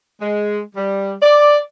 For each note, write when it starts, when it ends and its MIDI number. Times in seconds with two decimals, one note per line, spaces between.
0.21 0.60 56
0.76 1.14 55
1.22 1.58 74